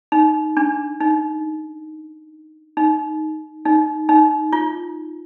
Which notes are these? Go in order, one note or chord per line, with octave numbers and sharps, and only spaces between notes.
D#4
D4
D#4
D#4
D#4
D#4
F4